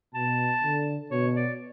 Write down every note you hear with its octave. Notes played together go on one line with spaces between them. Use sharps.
B2 A5
D3
B2 C#5
D5